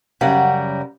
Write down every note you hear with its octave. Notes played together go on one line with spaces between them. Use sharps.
F#2 C#3 G3 A#4 F#5